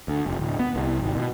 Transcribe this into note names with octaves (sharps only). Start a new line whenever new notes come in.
D2
F1
D1
B3
C2
G#1
B2